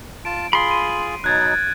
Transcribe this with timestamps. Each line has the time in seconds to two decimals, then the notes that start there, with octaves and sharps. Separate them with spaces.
0.25 F4 A5 D7
0.53 F4 G#4 B5 C6
0.71 D#7
1.24 B2 F#3 D#4 F#6 G#6 A6